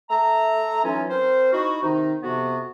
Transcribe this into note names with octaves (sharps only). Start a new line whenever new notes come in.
A3 E5 A#5
E3 F#3 C#4 D#4 F4
C4 A#4 C5
D#4 E4 F#4
C3 D#3 D#4
F2 C3 B3 F#4